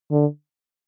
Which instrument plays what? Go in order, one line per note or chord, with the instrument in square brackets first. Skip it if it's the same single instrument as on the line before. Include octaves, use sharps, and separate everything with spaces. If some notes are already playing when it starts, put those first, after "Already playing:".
[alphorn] D3